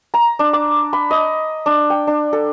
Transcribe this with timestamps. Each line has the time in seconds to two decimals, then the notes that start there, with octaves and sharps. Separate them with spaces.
0.14 A#5
0.39 D4
0.53 D6
0.93 B5
1.11 D#5
1.66 D4
1.90 G5
2.07 D4
2.33 A4